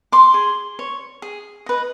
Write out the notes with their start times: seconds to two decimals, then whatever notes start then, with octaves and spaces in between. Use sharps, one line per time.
0.12 C6 D6
0.34 G#4
0.79 C#5
1.22 G#4
1.66 B4 D#5